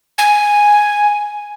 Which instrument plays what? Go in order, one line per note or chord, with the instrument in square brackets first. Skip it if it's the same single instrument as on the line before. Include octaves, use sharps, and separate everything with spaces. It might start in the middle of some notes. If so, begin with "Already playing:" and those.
[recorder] G#5